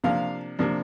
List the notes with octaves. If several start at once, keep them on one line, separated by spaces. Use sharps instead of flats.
C3 F3 A#3 D4 F5
C3 F3 A#3 D4